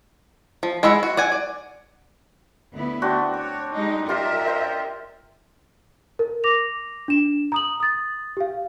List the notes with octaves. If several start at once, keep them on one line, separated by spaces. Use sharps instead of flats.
F3
G#3 E4 D#5 E5 F#5
F#4
D5 F#5 G#5
D5
D2 B3 E4
C4 D4 F#4
C#5 D6
G3 G#3 D#4
F4 G4 A#4 D#5 E5 C6
C5
A#4
D6 A#6 F7
D4 E7
A#5 D#6 F#7
D#6 A6
G4 F5